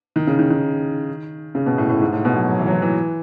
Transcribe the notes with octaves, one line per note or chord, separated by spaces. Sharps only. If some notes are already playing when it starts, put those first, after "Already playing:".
D#3
C#3
D#3
D#3
C#3
B2
A2
A2
G#2
A2
B2
F#3
F#3
E3
F#3
E3
E3